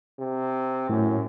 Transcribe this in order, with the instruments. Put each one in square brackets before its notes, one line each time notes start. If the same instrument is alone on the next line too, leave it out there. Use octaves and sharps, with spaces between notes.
[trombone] C3
[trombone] F#2 [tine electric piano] A2